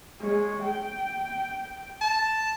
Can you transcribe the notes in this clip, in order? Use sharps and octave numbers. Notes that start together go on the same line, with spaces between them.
G#3 C#5
G5
A5